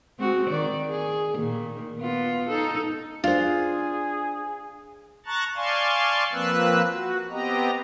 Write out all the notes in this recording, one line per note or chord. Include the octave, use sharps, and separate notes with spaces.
G#3 C4 F#4
D#3 D5
G#4
A#2 D#3 A#3
B3 F4
D#4 A4
D4 F4 G#4 C5
A5 A#5 C#6 F#6 A6
D5 F5 G#5 A5 C6 C#6
F3 A#3 C4 B4 E6 F#6
F#4
B3 C4 G4 D#5 A#5